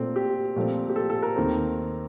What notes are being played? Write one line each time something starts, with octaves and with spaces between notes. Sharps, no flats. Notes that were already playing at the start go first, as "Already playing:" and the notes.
Already playing: A#2 A3 C4
G4
A#2 F3 A3 C4
G4
A4
A4
A#4
D#2 D#3 A3 C4